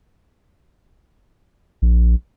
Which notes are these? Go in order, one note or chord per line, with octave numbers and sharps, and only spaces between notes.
A#1